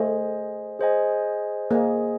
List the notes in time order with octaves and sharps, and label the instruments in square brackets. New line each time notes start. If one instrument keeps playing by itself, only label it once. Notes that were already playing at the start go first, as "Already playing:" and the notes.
Already playing: [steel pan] A3 [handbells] G#4 C5 D#5 G#5
[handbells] G#4 C5 D#5 G#5
[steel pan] A#3 [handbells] G#4 C5 D#5 G#5